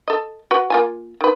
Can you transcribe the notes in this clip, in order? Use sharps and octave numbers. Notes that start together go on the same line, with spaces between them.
A4 D#5
F#4 B4
A#3 F4 G#5
D#3 B4